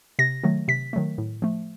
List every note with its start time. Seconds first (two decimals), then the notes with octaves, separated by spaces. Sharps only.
0.19 C3 A#6
0.44 D#3 F#3 A3
0.68 C3 B6
0.93 D#3 F#3 A3
1.18 A2
1.42 F3 A3